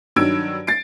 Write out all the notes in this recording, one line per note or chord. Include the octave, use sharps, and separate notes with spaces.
G2 D#3 F#3 E6 G#6 D7
A6 C7 D7